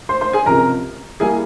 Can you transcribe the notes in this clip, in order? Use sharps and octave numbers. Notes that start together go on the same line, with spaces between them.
C5 C6
C5 C6
G#4 G#5
C#2 C3 F3 A#4 A#5
G3 A#3 E4 G#4 G#5